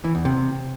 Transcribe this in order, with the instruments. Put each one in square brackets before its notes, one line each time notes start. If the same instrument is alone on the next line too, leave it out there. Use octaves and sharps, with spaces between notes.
[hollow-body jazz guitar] E3
E2
C3